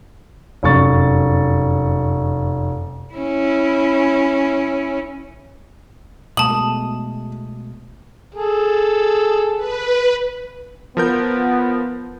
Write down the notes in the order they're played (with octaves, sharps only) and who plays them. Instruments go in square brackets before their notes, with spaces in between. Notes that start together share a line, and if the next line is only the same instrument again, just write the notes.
[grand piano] F1 F#2 C#6 A6
[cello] C#4 E4
[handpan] B2 G#3 A3 [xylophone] A5 F#7 [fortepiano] D#6
[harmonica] G#4 A4
[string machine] B4
[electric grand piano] F3 A#4 G6 [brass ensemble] B3